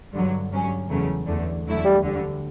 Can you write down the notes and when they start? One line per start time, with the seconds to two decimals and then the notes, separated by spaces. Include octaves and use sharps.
0.13 G2 D3 F#3
0.51 G2 F#3 C#4
0.89 E2 C#3 F#3 A3
1.27 E2 D3 A3
1.65 E2 D3 F#3 A3 E4
1.85 G3
2.03 D2 D3 G3